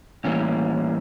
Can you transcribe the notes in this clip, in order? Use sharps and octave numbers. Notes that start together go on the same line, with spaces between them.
A2 E3 G3 A#3 C#4